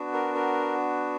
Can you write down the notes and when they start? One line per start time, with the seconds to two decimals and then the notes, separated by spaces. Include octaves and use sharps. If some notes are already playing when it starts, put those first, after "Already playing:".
Already playing: B3 D4 F#4
0.13 A#4
0.35 A#4